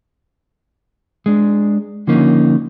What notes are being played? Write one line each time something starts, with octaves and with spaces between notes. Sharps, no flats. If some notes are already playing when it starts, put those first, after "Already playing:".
G#3 D4
D3 F3 A#3 C#4 D#4